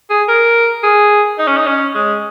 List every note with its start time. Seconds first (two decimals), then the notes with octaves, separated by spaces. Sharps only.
0.10 G#4
0.28 A#4
0.83 G#4
1.38 D#4
1.47 C#4
1.57 D#4
1.67 C#4
1.95 G#3